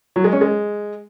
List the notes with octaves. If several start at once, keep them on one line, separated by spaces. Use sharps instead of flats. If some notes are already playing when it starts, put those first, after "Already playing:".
F#3
G#3
C#4
G#3